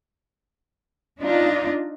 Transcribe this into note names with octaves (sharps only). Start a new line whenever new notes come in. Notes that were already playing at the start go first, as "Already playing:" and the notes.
D4 D#4 F4